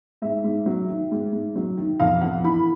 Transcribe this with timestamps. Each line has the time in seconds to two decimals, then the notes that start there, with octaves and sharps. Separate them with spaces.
0.22 G#2 E5
0.44 G#2
0.66 F#3
0.89 D#3
1.11 G#2
1.33 G#2
1.56 F#3
1.77 D#3
2.00 F2 F5
2.21 F2 F#5
2.44 E3 B5